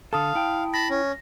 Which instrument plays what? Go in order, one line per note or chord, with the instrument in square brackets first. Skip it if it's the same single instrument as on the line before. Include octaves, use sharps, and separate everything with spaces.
[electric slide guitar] D3 A4 [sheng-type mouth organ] F5 [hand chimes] A5 D#6
[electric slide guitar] E4 G5
[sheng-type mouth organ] A5 B5 [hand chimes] A#6
[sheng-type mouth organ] C#4